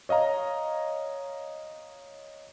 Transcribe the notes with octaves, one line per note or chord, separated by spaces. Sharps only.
C#5 D#5 F5 A#5